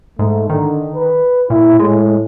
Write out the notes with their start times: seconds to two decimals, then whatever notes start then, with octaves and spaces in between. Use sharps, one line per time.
0.19 G#2 A3
0.50 D3 D#3
0.95 B4
1.50 A#2 E4
1.79 A2 G#3